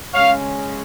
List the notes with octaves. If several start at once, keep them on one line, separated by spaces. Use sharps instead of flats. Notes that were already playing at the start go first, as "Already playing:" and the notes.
C#3 G#3 C#4 C#5 F5